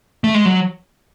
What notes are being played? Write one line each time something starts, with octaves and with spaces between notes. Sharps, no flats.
A3
G#3
F#3